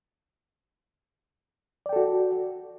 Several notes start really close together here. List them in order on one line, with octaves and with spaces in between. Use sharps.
D5 G5 A4 F#4